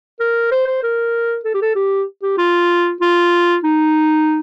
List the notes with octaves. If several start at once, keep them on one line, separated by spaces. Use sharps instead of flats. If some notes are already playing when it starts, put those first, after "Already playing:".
A#4
C5
C5
A#4
A4
G4
A4
G4
G4
F4
F4
D#4